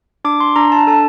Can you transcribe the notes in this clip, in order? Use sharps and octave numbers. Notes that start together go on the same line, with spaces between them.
D4 D6
C6
D4 A#5
A5
A4 A5